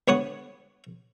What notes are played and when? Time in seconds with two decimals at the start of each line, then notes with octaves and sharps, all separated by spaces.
0.08 D2 B3 C#5 F#5 D#6